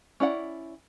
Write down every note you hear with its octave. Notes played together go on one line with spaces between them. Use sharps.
C#4 E4 D5 F#5